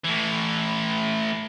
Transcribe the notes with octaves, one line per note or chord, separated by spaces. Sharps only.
A2 E3